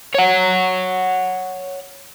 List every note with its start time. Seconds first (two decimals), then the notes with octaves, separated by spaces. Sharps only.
0.15 C#5 F#5